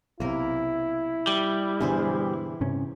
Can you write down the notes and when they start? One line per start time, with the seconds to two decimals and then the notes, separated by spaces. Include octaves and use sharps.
0.20 B1 C3 A#3 E4 A#4
1.27 G3
1.81 G2 B2 D3 E3 G#4 C5
2.61 G2 C3 C#4